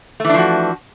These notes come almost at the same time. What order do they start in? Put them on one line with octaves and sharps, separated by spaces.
A3 E3 D4 F3 F#4